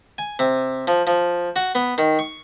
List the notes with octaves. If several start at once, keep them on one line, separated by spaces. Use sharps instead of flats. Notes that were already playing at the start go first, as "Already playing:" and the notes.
G#5
C3
F3
F3
F#4
B3
D#3
C#6